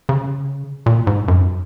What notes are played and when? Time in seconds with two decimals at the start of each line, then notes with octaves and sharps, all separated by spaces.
0.09 C#3
0.86 A#2
1.07 G#2
1.28 F#2